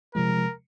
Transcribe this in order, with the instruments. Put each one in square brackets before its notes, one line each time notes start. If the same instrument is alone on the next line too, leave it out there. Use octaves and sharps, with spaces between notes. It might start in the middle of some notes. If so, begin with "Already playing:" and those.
[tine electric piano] C3 F3 G#3 [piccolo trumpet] A#4